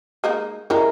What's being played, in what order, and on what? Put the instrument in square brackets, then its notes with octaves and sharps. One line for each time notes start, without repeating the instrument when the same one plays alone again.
[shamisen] G#3 A#3 D#4
[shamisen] D3 G#3 C#4 [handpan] E4 A#4